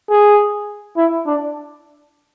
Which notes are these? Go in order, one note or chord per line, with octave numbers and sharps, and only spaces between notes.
G#4
E4
D4